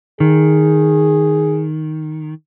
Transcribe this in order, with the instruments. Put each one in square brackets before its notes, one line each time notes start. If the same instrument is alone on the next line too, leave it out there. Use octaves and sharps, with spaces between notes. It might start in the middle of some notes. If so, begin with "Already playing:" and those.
[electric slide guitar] D#3 [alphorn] G#4